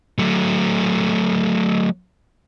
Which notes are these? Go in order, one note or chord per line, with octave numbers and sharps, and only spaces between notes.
F#3 A3